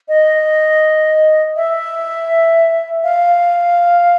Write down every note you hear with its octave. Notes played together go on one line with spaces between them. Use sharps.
D#5
E5
F5